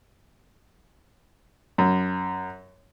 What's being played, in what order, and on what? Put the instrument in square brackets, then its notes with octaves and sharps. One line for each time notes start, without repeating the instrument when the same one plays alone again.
[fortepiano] F#2